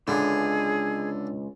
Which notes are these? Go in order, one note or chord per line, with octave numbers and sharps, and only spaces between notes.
C#2 D3 G#4